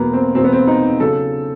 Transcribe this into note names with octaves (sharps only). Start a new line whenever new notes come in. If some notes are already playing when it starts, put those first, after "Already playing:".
Already playing: E2 B2 F#3 A#3 B3
C4
E2 B2 F#3 C4
B3
C4
D#4
C#3 F#3 A4